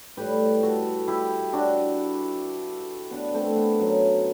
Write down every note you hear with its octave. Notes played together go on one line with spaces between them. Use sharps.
A2 G3 G4 B4
F#4 A4
E4 G4
D4 F#4
B3 D4
A3 C4
B3
F#2 F#3